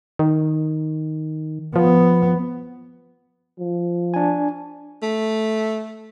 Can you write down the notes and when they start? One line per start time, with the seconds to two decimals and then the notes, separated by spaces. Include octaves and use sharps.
0.19 D#3
1.76 F3 B3
3.59 F3
4.14 D4 G#5
5.03 A3